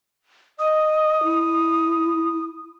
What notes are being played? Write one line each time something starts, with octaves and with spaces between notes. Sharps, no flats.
D#5 D#6
E4